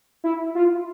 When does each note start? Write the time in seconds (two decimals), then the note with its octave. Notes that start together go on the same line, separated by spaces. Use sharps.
0.24 E4
0.55 F4